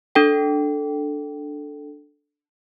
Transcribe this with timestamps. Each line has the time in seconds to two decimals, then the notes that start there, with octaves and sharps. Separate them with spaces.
0.15 D4 A4 G5